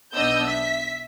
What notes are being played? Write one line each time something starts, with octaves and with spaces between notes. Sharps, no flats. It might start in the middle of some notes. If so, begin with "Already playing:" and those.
B1 B3 D4 D#5 E6 G6
E5 B6